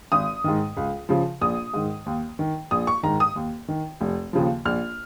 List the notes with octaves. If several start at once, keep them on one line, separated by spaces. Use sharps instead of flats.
G#1 D#6
G#2 D#3
C#2
C#3 F3
A#1 D#6
G#2 D#3
D#2
D#3
A#1 D#6
C#6
G#2 D#3 A#5
D#6
D#2
D#3
F1
D#2 C#3 F3
A#1 F6